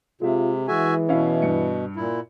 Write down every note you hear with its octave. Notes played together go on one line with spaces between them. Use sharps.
C3 G#3 F4 E5
E3 G#3 F#4 E5 G#5
B2 C#4 E4 F5
G2 C#7
A#2 E4